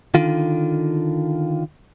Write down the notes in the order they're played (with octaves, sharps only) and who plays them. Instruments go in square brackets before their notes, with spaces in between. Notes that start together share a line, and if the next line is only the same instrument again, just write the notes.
[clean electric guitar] D3 D#3 F4